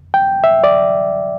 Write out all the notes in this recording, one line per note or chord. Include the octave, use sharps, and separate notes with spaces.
G5
E5
D5